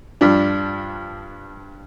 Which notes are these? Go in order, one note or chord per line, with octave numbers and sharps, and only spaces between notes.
G2 F3 D4